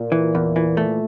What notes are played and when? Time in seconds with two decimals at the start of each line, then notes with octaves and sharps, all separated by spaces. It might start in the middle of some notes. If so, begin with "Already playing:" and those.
Already playing: A#2
0.12 E3
0.35 E2
0.56 E3
0.77 A3